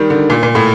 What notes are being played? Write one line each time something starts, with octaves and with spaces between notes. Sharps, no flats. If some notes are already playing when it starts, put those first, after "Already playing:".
Already playing: D#3 G3
D3
A#2
A#2
A2